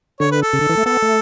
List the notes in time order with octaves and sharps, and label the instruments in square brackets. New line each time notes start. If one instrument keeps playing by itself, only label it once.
[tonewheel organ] D3 [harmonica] C#5
[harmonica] B4
A4
[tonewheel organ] C#3
D3
E3
A3
[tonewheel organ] B3 [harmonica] A4
[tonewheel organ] A3